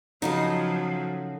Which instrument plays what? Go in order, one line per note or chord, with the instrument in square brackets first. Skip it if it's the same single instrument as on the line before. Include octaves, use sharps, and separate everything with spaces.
[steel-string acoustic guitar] C#3 F#4 A4 [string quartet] F3 F#3 [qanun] D#4